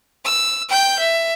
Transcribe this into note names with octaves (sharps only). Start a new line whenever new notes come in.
E6
G5 G6
E5